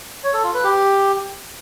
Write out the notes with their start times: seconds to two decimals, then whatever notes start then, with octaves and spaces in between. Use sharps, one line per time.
0.24 C#5
0.34 A4
0.44 F4
0.54 B4
0.64 G4